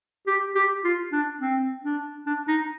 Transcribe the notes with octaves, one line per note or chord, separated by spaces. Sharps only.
G4
G4
F4
D4
C4
D4
D4
D#4